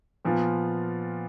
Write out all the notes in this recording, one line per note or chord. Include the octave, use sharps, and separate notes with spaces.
A#2 F3 B3 F4